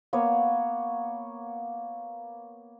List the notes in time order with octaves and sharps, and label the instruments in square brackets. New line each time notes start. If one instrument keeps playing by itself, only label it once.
[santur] A#3 B3 C#5